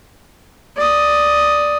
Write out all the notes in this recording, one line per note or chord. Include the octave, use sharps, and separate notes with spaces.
D5 D#6